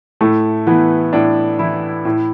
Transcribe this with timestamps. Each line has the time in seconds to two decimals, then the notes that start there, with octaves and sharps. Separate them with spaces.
0.21 A2 A3
0.67 E3 B3
1.13 A2 D4
1.59 E3 E4
2.05 A2